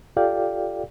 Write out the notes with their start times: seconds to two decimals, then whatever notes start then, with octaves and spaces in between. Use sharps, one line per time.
0.17 F4 G4 A4 D5 F5 G5